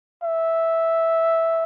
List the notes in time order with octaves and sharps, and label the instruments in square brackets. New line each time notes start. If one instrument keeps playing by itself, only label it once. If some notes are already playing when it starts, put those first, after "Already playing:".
[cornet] E5